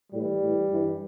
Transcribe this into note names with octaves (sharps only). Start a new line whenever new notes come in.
A2 E3 G3
A2 E3
G2 E3